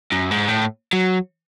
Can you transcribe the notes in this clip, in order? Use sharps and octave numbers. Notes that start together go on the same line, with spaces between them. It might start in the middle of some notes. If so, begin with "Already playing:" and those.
F#2
G#2
A2
F#3